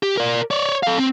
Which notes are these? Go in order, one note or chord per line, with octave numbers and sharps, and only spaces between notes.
G4
A#4 D5
C#5 D5
A4 F5
C4